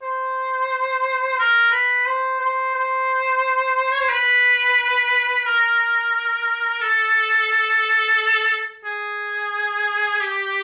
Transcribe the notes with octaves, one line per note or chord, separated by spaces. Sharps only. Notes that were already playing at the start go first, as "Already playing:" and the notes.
C5
A#4
B4
C5
C5
C5
C#5
C5
B4
A#4
A4
G#4
G4